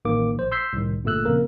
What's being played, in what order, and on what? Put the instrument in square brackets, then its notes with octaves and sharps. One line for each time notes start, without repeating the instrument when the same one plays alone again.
[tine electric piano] A1 D#3 A#3 D6
A#1 C5
C6 E6 G6 B6 C7
C2 A2 D#3
G1 A#2 D3 A3 E6 F#6
F2 C#3 A#3 A#4